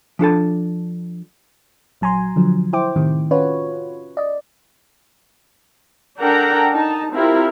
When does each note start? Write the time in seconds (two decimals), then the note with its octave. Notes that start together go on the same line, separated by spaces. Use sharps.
0.19 F3 D4 A4 A5
2.01 A#1 F#3 G#5 A#5 C6
2.36 D3 F3 F#3
2.73 E4 C5 G5 D6
2.96 A2 C3 D#3
3.31 C#4 F4 F#4 B4 C#5
4.17 D5 D#5
6.20 D4 A4 A#4 F#5 G5 A#5
6.73 D#4 A5
7.13 C4 E4 F4 G4 A#4